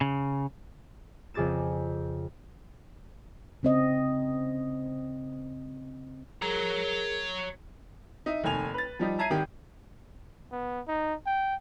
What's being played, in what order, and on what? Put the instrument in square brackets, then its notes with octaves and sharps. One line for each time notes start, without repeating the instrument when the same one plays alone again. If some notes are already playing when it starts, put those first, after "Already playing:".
[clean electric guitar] C#3
[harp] F2 C#3 G#4 D6 A6 E7
[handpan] C#3 C4 D#5
[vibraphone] G#4 A#4 [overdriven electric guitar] C#5 A#5
[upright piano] D#4 E5
F1 D#2 G#5 F7
B4 A6
F3 G3 D#4
E5 A5 A#5 G#6 C7 D#7
G#1 D#3 G4 G5
[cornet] B3
D#4
G5